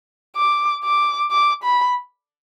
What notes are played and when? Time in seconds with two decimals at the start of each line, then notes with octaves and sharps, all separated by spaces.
0.36 D6
0.84 D6
1.31 D6
1.63 B5